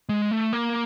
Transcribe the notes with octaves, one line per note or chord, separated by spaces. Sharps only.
G#3
A3
A#3